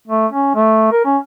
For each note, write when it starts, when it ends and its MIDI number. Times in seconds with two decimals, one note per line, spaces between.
0.08 0.27 57
0.32 0.51 61
0.55 0.91 57
0.92 1.00 70
1.05 1.17 61